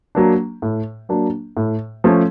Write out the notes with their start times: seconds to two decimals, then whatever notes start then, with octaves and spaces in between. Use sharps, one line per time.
0.15 F#3 A#3 D4
0.62 A2
1.09 F#3 A#3 D4
1.57 A2
2.04 F3 A3 C#4